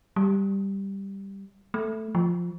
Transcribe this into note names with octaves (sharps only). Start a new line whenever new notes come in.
G3
A3
F3